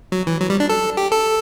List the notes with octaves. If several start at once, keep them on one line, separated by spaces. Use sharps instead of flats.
F#3
E3
F#3
G3
D4
A4
G4
A4